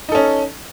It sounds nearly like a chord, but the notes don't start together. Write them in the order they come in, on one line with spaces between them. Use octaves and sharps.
D#4 A4 C#4